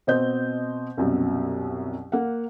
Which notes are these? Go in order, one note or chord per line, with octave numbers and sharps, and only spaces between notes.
B2 C4 C5 D#5 G6
C2 F#2 B2
A#3 F5 F#5